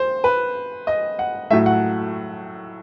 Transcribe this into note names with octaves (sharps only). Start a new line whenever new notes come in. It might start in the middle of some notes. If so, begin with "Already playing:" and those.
Already playing: C5
B4
D#5
F#5
A2 F#3 A3 E5
F#5